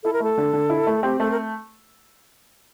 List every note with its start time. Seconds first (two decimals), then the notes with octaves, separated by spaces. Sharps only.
0.03 E4 A4
0.13 A#4
0.20 A3 A4
0.38 D3
0.53 D3
0.70 E4
0.87 A3
1.03 C4 G4
1.20 A3 A4
1.31 A#4